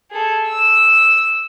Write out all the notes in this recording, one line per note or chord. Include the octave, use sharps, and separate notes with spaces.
G#4 A4
E6